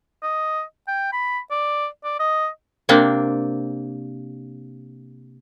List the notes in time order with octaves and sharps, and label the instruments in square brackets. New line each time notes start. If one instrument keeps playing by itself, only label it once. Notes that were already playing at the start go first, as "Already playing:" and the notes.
[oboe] D#5
G5
B5
D5
D5
D#5
[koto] C3 A#3 C4 D4